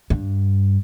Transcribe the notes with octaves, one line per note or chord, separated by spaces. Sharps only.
G2